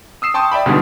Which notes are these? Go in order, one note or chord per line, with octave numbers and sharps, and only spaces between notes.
D#6 E6 C7 E7
G5 A5 C6 C#6 D#6 G6
D5 E5 G5 B5
G1 G#2 B2 D3 G3